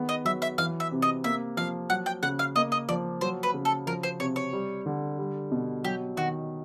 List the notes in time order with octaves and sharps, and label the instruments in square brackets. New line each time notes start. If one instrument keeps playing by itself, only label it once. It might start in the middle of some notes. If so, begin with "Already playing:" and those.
Already playing: [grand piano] D#3 G#3 B3
[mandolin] D#5
[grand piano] F#3 [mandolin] E5
[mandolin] E5
[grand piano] E3 [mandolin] F5
[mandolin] E5
[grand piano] C3
[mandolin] D#5
[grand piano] A#3 [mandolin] E5
[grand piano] F3 [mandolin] F5
[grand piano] F#3 [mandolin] F#5
[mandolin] G5
[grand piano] C#3 [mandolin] F#5
[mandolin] F5
[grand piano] A#3 [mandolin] D#5
[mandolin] D#5
[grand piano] F3 [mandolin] D5
[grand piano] F#3 [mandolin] C5
[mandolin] B4
[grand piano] C#3
[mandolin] A4
[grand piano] F3 [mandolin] A#4
[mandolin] C5
[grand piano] C3 [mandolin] C#5
[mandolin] C#5
[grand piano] G3
D3
G3
B2
[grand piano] F#3 [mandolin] G4
[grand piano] D#3 [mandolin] F#4